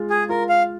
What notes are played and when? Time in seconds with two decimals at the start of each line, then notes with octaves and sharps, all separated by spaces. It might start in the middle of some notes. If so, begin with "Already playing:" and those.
Already playing: G#3 F4
0.10 G#4
0.29 F4 A#4
0.49 F5